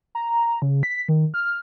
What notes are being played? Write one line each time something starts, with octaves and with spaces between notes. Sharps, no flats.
A#5
C#3
B6
D#3
F6